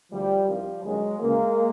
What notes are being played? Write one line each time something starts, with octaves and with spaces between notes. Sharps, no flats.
D2 D3 F3 G3
C2 C3 D#3 F3 G3
G1 F#2 D#3 F#3 G#3
D2 C#3 E3 G#3 A#3